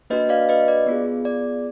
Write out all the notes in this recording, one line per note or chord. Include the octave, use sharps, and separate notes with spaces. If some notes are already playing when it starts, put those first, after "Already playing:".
A#3 D4 F#4 B4 D#5
D5 F5
B4 D#5
D5
B3 F4 G#4
D5